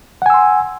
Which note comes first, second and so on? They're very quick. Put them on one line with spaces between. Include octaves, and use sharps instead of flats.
F#5 G#5 E6 C6